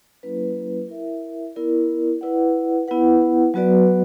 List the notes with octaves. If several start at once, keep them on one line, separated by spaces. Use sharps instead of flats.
F#3 A#3 C#4 E4 B4
E4 A#4 E5
B3 E4 A#4 D5
E4 B4 D5 F#5
B3 E4 B4 F#5
F#3 B3 F#4 B4 D5